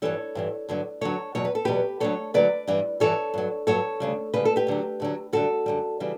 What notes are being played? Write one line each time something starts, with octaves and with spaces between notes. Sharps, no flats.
G2 E3 G3 A4 C#5
G2 E3 G3
G2 D3 F#3
G2 D3 F#3 A4 C#5
E2 B2 F#3 C#5
B4
A4
E2 B2 F#3 G4 B4
D2 D3 F#3 A4 C#5
D2 D3 F#3 B4 D5
G2 E3 G3
G2 E3 G3 A4 C#5
G2 F#3
G2 F#3 A4 C#5
D2 C#3 G3
D2 C#3 G3 B4
A4
G4 B4
D2 D3 F#3
D2 D3 F#3
F#2 D3 G3 F#4 A4
F#2 D3 G3
C#3 E3 G3